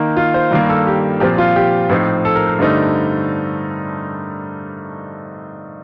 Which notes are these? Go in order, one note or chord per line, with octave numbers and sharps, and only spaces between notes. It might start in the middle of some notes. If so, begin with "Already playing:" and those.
Already playing: D#3 A#3 D#4
F4
C5
G2 D#3 G3 A#3 F4
A4
G4
A#2 F3 C4 G4
F4
G4
A2 F3 C4 D#4
A4
A#4
A#4
G2 D3 A3 C4 D#4